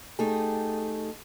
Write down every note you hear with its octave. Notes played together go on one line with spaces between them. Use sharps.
A3 D#4 G4 G#4